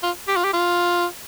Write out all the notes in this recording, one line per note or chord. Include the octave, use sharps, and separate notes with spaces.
F4
G4
F4
G4
F4